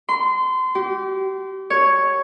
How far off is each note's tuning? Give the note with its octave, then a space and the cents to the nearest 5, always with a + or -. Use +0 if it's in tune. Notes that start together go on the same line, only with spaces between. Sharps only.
C6 -25
G4 -35
C#5 +0